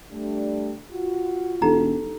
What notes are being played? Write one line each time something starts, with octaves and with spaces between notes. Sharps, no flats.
G3 A3 D4
F4 F#4
E1 D#4 G4 A4 A#5